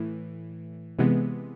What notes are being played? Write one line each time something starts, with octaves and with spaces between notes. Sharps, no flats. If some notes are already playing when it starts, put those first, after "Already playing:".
Already playing: A2 E3
C3 E3 G#3 B3